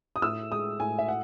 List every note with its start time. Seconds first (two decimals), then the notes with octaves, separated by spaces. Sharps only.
0.16 D#6
0.22 A2 E6
0.51 G#3 D#6
0.80 A2 G#5
0.99 E5
1.08 F#5